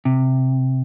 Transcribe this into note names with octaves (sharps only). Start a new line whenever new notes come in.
C3